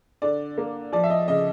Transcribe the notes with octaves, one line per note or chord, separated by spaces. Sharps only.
D3 D5
A#3
F3 D5
E5
D#5
C#3 D#5